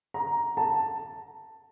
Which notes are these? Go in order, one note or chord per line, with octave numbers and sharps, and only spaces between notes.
A#5
A5